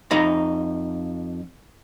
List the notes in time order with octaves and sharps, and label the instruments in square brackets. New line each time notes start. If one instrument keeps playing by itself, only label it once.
[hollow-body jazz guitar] F2 D#4 A#5 B5